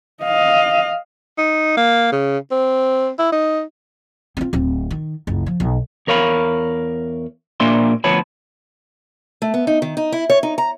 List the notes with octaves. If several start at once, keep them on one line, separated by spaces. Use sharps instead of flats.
D#5 F5
D#4
A#3
C#3
C4
E4
D#4
C4 F4
D1 C4
D#3
F#1 C#2
F3
B1
E2 A#4 C#5 F5 B5
A#2 A#3 D4 E5 C6
D2 F3 B3 C#5 A5 B5
A3
B3
D#4
D#3
D#4
E4
C#5
D#4
A#5